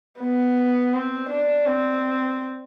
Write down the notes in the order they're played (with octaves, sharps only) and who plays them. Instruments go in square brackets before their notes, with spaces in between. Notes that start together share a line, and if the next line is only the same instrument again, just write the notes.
[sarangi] B3
C4
D4
C4